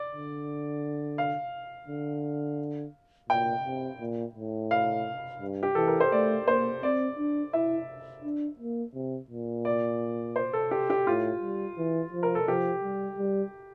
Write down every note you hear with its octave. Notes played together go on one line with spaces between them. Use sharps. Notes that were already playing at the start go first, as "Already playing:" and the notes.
Already playing: D5
D3
F5
D3
A#2 G5
C3
A#2
A2
F5
G2
G4
E3 A4
A#4
C5
A3 D5
A#3 C5
C4 D5
D4
E4 E5
D4
A#3
C3
A#2
D5
C5
A4
G4
G4
A2 F4
G3
E3
F3
A#4
A4
F3 G4
G3
G3